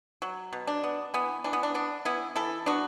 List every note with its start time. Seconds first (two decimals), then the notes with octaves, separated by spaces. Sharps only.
0.22 F#3
0.53 B2
0.67 D4
0.84 B3
1.14 E3 B3
1.44 E3 D4
1.53 B3
1.63 D4
1.74 B3 D4
2.05 E3 B3 E4
2.36 E3 E4 A4
2.66 B3 D4 F#4